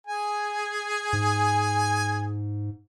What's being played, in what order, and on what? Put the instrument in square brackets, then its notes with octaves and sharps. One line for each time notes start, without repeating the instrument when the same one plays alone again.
[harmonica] G#4 G#5
[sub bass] G#2